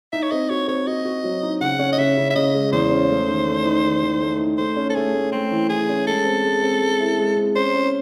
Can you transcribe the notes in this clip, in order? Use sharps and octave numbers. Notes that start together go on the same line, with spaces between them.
D#4 E5
C#5
C4 D#5
F#4 C#5
C4 C#5
F#4 D#5
F#4
F#3
D#4
C#3 F#5
C#4
D#5
C#3 E5
C#3
E5
C#3 D#5
G#3
E2 C5
C#4
A3
D#3
A3
D#4
D#3
D#3
A3
D#4
A3 C5
C#4
A4
A3 G#4
A3
A3 C4
E3
E3 G#4
C#4
G#3 A4
C4
G#3
C4
G#3
E4
G#3
C4
C#4 C5
C#4